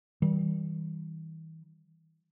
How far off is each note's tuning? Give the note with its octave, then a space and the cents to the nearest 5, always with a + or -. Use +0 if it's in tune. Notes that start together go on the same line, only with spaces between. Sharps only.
E3 -45 G3 -15